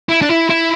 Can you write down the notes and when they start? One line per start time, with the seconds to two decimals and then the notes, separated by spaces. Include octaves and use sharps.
0.09 E4
0.22 D4
0.29 E4
0.50 E4